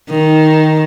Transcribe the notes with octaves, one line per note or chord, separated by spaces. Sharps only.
D#3